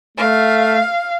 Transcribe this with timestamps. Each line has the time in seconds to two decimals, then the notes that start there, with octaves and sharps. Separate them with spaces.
0.17 A3 F5